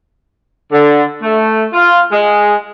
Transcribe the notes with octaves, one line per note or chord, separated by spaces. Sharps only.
D3
A3
F4
G#3